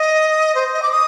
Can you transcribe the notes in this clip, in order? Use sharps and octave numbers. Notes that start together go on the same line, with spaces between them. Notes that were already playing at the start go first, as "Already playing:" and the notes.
Already playing: D#5
C5
D#5
D6
D#6